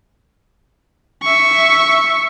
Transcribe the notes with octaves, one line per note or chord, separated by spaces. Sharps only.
E5 C#6